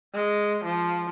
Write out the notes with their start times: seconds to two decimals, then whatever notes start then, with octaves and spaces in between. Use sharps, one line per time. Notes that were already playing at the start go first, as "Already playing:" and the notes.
0.14 G#3
0.64 F3